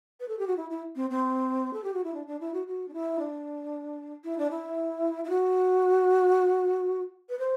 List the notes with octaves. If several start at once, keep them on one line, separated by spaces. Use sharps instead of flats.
B4
A4
G4
F#4
E4
E4
C4
C4
A4
G4
F#4
E4
D4
D4
E4
F#4
F#4
D4
E4
D4
E4
D4
E4
E4
F#4
B4
C5